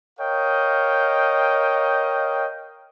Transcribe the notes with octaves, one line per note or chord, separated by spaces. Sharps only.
A#4 C#5 D#5 F5 G5